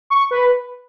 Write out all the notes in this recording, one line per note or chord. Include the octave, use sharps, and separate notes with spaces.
C#6
B4